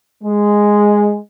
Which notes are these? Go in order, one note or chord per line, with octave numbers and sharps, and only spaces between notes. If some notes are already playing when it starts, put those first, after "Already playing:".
G#3